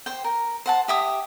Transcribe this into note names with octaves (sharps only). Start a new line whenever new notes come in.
C5 G5
A#4
C5 F#5 A5
G4 E5 D#6